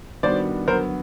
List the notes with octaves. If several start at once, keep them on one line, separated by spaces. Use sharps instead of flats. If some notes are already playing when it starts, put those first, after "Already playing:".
D#3 G3 B3 D4 F#4 C5 D5
D3 F#3 B3 A#4 C5